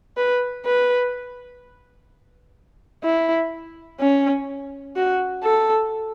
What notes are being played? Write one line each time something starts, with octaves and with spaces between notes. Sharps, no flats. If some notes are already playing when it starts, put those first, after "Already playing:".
B4
B4
E4
C#4
F#4
A4